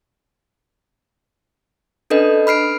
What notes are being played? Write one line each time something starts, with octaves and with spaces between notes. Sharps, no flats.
C#4 D4 A4 B4 D#5
B5 F6 C7 D7